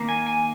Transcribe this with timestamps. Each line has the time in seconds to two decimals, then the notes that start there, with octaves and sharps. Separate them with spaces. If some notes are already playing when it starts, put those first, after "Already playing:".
Already playing: D#3 A#3
0.09 G#5
0.27 G#5